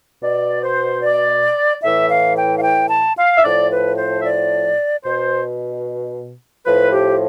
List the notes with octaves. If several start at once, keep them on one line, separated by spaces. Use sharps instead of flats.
B2 D5
C5
D5
A2 E3 E5
F5
G5
F5
G5
A5
F5
E5
A2 F3 D5
B4
C5
E5
D5
B2 C5
A2 F3 B4
G4